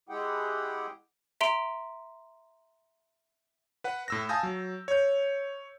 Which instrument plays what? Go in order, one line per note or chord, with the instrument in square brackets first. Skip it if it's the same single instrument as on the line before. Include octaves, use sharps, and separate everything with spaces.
[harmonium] G#3 E4 G4 G#4 F#5 G5
[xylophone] E5 A#5 C6 D7
[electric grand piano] B4 F#5
A2 E6 A#6
F5 G#5 A5 D#6 G6 A#6
F#3
C#5 G6